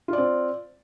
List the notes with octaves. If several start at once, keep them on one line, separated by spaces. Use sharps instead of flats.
C4 F4 D5